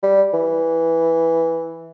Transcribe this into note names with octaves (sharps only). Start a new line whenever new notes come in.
G3
E3